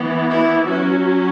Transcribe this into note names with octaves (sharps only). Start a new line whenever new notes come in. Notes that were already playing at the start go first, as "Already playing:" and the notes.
Already playing: E3 B3
E4
F#3 C#4 F#4